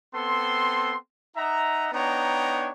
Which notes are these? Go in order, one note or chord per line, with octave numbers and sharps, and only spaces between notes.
B3 C4 A4 C6
D#4 D#5 E5 F#5 A#5
B3 D4 D#4 C#5 G5 A#5